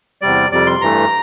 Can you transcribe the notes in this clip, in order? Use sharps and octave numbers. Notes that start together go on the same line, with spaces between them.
E2 C3 G3 D5
F2 C3 G3 D5
C6
G2 E3 A3 A#5